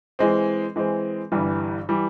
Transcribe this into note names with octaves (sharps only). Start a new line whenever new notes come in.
E3 G#3 C4
E3 G#3 C4
G1 G2 E3 G3
E3 G3